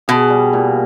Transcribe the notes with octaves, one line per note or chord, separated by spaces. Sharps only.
B2 G#4
G3
A#2